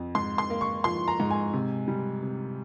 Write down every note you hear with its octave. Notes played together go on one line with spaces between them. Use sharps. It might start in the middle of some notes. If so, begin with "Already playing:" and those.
Already playing: F2
G#2 C6
C6
A#3
C#6
F3 C6
A#5
G#2
G#5
C3
G3
C3